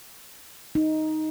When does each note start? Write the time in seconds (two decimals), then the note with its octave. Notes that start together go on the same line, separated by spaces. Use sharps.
0.75 D#4